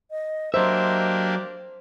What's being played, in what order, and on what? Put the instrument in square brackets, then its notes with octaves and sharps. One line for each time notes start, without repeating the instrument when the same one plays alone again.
[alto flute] D#5
[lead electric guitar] F#3 E5 [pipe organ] A#3 D4 G4 [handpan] C5 [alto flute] D#5